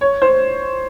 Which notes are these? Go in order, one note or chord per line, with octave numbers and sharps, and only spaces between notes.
C#5
C5